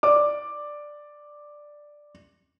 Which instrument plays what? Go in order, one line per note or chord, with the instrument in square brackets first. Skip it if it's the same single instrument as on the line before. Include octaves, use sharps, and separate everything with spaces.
[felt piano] D5 D6